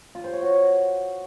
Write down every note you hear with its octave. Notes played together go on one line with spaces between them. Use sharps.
F4
C5
C#5
F#4